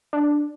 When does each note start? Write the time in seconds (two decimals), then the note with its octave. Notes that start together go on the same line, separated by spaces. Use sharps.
0.13 D4